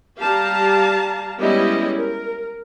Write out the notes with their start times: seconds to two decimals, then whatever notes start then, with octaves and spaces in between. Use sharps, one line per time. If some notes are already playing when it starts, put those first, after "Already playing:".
0.22 G3 G4 F5 A5 A#5
1.40 G3 G#3 B3 C#4 E4 D#5
1.98 A#4